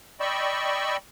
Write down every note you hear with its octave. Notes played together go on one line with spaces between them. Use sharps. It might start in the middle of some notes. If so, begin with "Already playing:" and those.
D5 D#5 G5 B5 C#6 E6